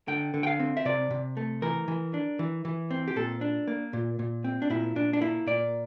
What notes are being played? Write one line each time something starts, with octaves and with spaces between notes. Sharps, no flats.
D3 G5
D3
G5
F5
C4
E5
C3 D5
C3
A3
E3 A#4
E3
D4
E3
E3
C4
G4
A#2 A4
D4
A#3
A#2
A#2
C4
D4
A#2 E4
A#2 D4
D4
A#3 E4
A#2 D5